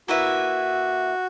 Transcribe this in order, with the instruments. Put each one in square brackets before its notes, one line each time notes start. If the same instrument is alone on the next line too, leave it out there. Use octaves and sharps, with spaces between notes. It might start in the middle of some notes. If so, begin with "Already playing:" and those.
[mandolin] A#3 E4 B4 E5 [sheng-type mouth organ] F#4